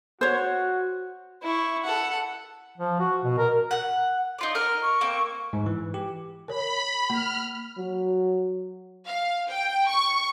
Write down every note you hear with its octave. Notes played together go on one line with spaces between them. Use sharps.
F#4 C5 C#5
E4 C#6
A4 F#5
F3
F#4
B2
A#4
F#5 F#6
D#4 F4 D5
A#4 D#5 A#5 F6
C#6
A#3 C4
G#2
E3
G4
A#4 C#5 B5
A#3 F6
F#3
F5
G5
C#6